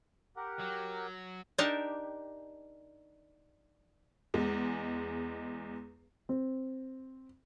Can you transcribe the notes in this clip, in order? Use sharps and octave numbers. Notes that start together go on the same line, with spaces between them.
G4 A#4 F#5
F#3
D4 D#4 G4 A#4 A5
E2 G#3
C4